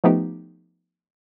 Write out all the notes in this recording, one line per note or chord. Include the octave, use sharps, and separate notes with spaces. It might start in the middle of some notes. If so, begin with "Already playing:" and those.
F3 A3 B3 D#4 G4